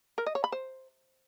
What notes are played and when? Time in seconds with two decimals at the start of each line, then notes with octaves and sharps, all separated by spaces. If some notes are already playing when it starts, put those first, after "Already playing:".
0.18 A#4
0.26 D#5
0.35 C#5
0.44 B5
0.52 C5